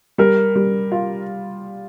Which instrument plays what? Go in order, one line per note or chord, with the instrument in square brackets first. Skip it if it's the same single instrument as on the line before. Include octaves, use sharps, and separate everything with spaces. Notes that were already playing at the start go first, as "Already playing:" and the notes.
[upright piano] G3 [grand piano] A#4
[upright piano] G3
F4